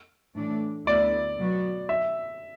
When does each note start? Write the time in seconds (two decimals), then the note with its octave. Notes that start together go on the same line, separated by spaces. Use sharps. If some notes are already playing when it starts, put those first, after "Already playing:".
0.35 A2 E3 A3 D4
0.87 D2 D3 B3 E4 D5
1.38 B2 F#3 B3 F#4
1.89 E5